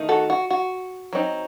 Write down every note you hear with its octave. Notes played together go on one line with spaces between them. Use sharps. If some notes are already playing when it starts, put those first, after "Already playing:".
Already playing: D#3 A3 D#4
F#4 A4
F#4
F#4
F#3 C4 D#4